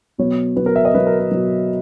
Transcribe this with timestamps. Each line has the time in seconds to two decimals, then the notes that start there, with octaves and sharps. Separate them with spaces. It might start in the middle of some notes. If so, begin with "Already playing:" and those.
0.18 B2 F#3 B3 C#5
0.56 B2 F#3 B3 B4
0.66 A#4
0.76 E5
0.85 D#5
0.94 B2 F#3 B3 B4
1.07 A#4
1.20 A#4
1.31 B2 F#3 B3